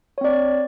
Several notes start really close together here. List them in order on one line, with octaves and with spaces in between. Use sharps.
C#5 C4 D5